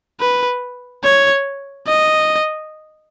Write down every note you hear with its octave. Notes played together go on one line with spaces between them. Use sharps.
B4
C#5
D#5